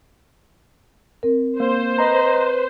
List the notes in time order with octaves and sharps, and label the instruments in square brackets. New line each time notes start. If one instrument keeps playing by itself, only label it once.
[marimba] C4 A#4
[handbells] A#3 [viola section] C5
[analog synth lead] B4 [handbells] D#5 A#5